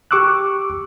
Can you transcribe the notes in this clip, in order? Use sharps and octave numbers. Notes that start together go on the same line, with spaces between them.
G4 C#6 D6 E6 F#6